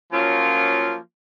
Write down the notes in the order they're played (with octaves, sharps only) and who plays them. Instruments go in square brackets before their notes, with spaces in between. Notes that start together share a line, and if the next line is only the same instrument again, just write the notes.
[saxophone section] F3 F#3 A#3 C#4 F4